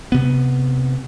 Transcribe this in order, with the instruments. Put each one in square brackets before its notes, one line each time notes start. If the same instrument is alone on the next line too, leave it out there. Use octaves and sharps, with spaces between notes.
[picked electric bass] C3 B3